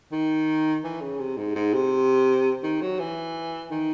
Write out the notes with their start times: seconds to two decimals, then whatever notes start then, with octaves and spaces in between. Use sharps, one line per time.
0.12 D#3
0.84 E3
1.01 C#3
1.20 C3
1.37 G#2
1.55 G#2
1.74 C3
2.63 D#3
2.81 F#3
2.99 E3
3.71 D#3